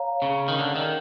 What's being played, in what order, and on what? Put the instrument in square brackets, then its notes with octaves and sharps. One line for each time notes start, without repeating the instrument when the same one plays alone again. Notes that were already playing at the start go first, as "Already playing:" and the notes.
Already playing: [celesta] C#5 F5 A#5
[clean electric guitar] C#3
D#3
D3
D#3